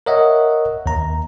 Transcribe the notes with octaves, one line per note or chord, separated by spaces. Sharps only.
A#4 C#5 D#5 E5 F#5
D#2 A#5